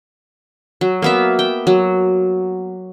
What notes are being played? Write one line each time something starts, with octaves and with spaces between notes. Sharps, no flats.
F#3
A#3 B3 E5
G5
F#3